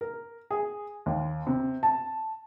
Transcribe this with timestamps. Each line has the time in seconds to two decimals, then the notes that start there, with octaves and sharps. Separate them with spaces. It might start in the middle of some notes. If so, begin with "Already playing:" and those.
0.01 A#4
0.51 G#4
1.06 D#2
1.47 C3
1.83 A5